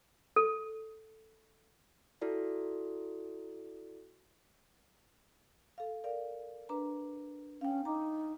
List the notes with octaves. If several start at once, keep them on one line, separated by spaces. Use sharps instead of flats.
A4
E4 F#4 A4 D5
A4 F5
A#4 D5 F5
D4 B4 A#5
C#4 F5 G5
D#4 A#5 D6